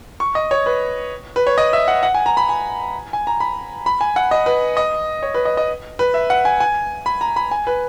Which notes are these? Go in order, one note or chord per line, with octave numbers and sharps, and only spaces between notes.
C#6
D#5
C#5
B4
B4
C#5
D#5
E5
F#5
F#5
G#5
A#5
B5
G#5
G#5
A#5
B5
B5
G#5
F#5
D#5
B4
D#5
C#5
B4
D#5
D#5
B4
E5
F#5
G#5
G#5
B5
A#5
B5
G#5
B4